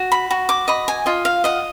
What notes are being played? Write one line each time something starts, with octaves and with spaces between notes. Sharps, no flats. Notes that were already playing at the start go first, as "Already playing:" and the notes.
Already playing: F#4
B5
F#4
D6
D#5 B5
G#5
F4 D#5
F5
D#5 F#5